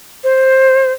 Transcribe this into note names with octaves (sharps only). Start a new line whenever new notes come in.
C5